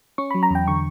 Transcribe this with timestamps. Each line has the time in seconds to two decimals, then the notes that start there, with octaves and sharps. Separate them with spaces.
0.18 C#4 C#6
0.31 F#3 B5
0.43 A#5
0.51 E2 G5
0.68 D3 C#6